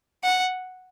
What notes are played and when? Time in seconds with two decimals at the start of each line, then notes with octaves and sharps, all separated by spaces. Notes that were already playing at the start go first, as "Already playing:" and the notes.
0.24 F#5